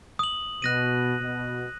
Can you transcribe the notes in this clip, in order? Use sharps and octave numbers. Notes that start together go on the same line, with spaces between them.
D#6 F#7
B2 F#6 A#6 D#7
B2